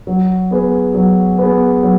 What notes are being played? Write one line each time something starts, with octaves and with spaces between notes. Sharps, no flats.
F#3
B3 G#4 B4
F#3
B3 G#4 B4
F#3